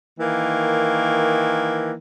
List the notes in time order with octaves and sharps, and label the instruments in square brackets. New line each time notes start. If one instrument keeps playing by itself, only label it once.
[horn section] D#3 E3 A#3